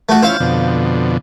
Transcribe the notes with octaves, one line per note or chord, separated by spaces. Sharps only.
A3 F#4
C#4 E4 F4 C5 F5
F2 B2 D3